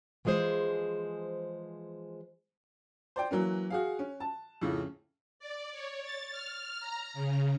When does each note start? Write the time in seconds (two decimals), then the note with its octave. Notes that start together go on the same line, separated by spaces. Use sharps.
0.25 E3 F3 G#3 G#4 C5
3.16 C5 D5 G5
3.31 E3 F#3 A#3 C#4
3.70 F#4 G#4 F5
3.99 C#4
4.20 A5
4.61 F2 A2 C#3
5.40 D5
5.72 C#5
6.03 A6
6.31 F6
6.80 A#5
7.14 C#3